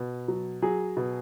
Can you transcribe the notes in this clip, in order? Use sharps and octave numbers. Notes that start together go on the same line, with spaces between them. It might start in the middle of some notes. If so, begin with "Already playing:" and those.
Already playing: B2
F#3
F#3 G#4
B2